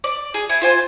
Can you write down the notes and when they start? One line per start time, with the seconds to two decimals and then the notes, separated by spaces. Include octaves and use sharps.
0.04 D5
0.34 G#4
0.49 E4 G#5
0.62 F4 C5 G#5